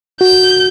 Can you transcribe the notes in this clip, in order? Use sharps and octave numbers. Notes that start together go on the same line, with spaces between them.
F#4 G6